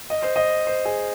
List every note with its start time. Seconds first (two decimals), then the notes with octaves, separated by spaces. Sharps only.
0.10 D#5
0.23 C5
0.36 D#5
0.67 C5
0.85 G#4